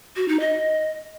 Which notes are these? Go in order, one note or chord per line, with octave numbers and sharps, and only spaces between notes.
F#4
D#4
D#5